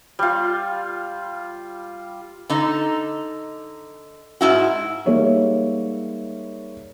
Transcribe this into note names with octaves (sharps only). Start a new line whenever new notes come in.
G3 F4
D3 D#4
G#2 E4 F#4
G3 G#3 A#3 D#4 C#5 E5